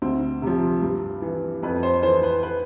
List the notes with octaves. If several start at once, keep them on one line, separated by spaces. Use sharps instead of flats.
D2 C4
C3 F3
G2
E3
F2 B4
C5
E3 C5
B4
B4